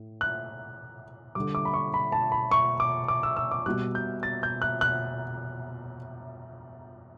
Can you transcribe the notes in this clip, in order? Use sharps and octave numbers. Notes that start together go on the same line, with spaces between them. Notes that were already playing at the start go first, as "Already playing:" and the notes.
Already playing: A2
F#6
D3 G3 D6
D6
B5
C#6
B5
A5
B5
C#6
D6
D6
E6
E6
D6
B2 G3 F#6
G6
A6
G6
F#6
F#6